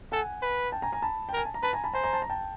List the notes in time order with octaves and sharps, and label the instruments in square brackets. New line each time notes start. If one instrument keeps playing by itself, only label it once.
[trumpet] A4 [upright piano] F#5 G#5
[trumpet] B4
[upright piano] G5 A5
G#5 A#5
G#5 A#5
A5 B5
G5
[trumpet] A#4
[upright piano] G#5
A5
A#5
[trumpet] B4 [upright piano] A5 B5
[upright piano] G#5 A#5
A5 B5
[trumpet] C5 [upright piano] G#5 A#5
[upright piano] G#5 A#5
A5
A#5
G5 A5